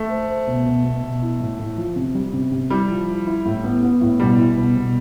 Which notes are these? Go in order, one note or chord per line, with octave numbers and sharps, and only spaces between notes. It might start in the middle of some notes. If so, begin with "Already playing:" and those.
Already playing: A3
C5
C5
B2
B2
B2
B2
E4
A2
A2
F3
C3
G3
C3
C3
G3 E4
F3
E4
E4
A2
B3
B3
A2
B2 G3
E4
B2
B2